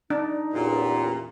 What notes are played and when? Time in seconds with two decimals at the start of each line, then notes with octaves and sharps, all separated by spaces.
0.10 D4 D#4
0.55 E2 A#2 C#4 G4